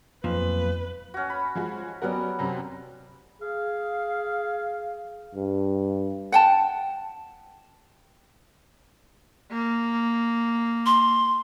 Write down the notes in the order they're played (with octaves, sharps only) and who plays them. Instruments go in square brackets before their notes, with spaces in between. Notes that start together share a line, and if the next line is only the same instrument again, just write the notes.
[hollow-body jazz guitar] B1 A#2 F3 [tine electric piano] F2 [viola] B4
[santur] C#4 F#4
B5
[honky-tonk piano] F3 G#3 F#4
[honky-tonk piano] F#3 B3 A#4 [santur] G3 C#4 F#5
[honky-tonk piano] F#2 C3 F#3 [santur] A#5
[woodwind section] G#4 F5
[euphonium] G2
[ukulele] F#5 G5 A5
[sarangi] A#3
[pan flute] C6